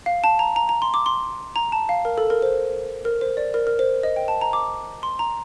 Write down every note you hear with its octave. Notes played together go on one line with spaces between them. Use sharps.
F5
A5
A#5
A#5
A#5
C6
D6
C6
A#5
A5
F5
A#4
A4
A#4
C5
A#4
C5
D5
A#4
A#4
C5
D#5
G5
A5
A#5
D6
C6
A#5